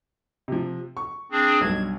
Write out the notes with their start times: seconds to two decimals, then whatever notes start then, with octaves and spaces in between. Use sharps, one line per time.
0.48 C3 F3
0.97 C#6
1.31 C4 D4 G#4
1.61 B1 G2 G#6